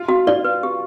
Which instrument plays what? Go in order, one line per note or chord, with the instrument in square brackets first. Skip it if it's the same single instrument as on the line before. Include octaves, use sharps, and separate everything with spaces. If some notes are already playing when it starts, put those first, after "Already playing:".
Already playing: [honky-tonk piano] F4
[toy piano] F#4
[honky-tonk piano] F4 [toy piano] D5
[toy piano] B4
G4